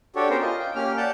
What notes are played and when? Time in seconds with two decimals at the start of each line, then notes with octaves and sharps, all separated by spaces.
0.16 D4 F#4 G4 A4 C#5
0.29 B3 C#4 A#4 C5
0.42 F4 D#5
0.60 G5
0.75 A#3 C#4 G4 F6
0.97 D5 F#5 A5 G6